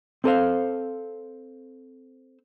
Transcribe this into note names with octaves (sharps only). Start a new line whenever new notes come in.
C4 A4 C5 F5